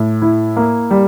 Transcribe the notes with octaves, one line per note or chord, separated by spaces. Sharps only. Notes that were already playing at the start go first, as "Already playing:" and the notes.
Already playing: A2
E4
A#3
G3